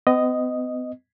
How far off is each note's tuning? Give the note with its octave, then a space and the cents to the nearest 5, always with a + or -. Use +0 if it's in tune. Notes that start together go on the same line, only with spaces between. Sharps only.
B3 +45 D#5 +0